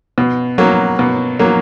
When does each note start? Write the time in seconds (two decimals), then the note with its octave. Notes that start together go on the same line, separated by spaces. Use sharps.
0.18 B2
0.58 F#3 A#3
0.99 B2
1.39 F#3 A#3